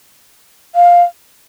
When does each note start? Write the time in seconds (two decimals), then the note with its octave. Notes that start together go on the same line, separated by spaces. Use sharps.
0.75 F5